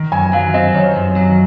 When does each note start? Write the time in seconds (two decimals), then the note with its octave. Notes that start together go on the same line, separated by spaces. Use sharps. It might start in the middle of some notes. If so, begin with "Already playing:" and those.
Already playing: D#3
0.12 F#2 G#5
0.33 F#3 F5
0.54 C4 D#5
0.74 D#3 C#5
0.96 F#2
1.16 F#3